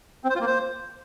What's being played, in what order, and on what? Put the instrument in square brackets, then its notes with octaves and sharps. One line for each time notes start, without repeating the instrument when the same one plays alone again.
[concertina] C4
C5
F4
A#3
C5